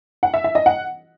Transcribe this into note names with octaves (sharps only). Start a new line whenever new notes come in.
F#5
E5
E5
D#5
F#5